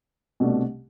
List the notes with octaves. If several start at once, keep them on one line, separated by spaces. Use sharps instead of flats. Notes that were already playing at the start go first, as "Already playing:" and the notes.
C2 B2 A3 D4